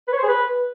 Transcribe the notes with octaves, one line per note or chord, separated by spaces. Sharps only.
B4
C#5
C5
G#4
B4